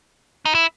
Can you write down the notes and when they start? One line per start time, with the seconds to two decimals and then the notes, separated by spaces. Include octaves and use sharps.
0.45 D#4
0.55 E4